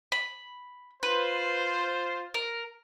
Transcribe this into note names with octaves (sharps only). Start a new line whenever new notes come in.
B5
F4 B4 C5
A#4